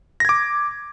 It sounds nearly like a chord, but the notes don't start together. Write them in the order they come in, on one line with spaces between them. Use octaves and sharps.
A#6 G#6 D6